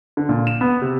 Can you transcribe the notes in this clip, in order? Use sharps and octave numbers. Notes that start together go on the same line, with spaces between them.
D3
A#2
E7
B3
C3